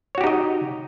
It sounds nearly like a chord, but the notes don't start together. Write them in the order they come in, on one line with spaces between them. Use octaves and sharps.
C#5 F#4 G4 D#4 D#5